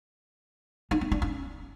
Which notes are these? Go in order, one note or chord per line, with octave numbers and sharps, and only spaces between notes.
D#4
C4
D4
C#4